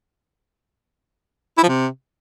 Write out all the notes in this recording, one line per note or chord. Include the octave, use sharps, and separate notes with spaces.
E4
F3
C3